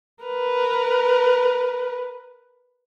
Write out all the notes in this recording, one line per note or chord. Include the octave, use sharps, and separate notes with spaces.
A#4 B4